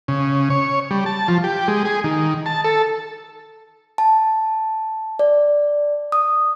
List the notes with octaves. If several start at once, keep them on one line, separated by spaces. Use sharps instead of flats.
C#3
C#5
G3
A5
F3
G4
G#3
G#4
D#3
A5
A4
A5
D5
D#6